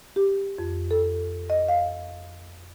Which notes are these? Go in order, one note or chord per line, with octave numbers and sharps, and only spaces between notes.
G4
F2
A4
D#5
F5